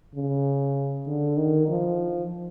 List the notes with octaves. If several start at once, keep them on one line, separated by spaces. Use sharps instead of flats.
C#3
D3
D#3
F3